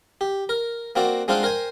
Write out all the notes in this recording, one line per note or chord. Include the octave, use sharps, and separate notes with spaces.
G4
A#4
A#3 C4 F#4 D5
G#3 C4 D4 F4 C5 F#5
A#4 C5 G5 G#5